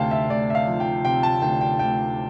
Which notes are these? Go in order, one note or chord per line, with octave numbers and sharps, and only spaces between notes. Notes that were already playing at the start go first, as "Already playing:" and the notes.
Already playing: D2 C3 F5 G5 A5
E5
D2 D5
E5
F5
F3
G5
C3 G5
A5
D2 G5
G5
D2 G5